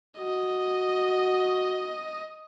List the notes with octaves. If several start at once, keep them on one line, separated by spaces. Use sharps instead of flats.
F#4 D#5